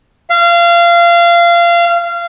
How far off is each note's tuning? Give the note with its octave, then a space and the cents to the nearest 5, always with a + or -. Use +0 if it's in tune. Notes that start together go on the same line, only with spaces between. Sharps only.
F5 -25